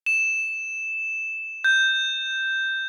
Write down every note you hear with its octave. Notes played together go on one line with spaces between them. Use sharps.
E7
G6